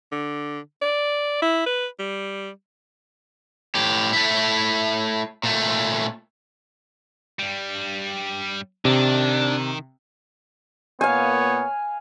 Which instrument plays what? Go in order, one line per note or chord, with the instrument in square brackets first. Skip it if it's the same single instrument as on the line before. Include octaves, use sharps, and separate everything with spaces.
[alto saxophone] D3
D5
E4
B4
G3
[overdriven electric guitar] A2 G4
A3 E4
A#2 A3
[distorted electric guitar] G2 G3
[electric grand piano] C3 [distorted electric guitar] D#3 [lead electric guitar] D4
[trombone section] A#2 A#3 B3 [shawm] C#5 [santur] F5 G#5